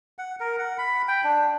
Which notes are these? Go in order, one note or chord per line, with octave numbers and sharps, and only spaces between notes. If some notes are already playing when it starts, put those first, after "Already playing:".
F#5
A#4
F#5
B5
G5
D4